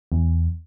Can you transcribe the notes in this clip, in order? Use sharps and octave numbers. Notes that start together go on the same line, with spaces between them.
E2